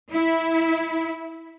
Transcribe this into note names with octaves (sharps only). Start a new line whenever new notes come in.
E4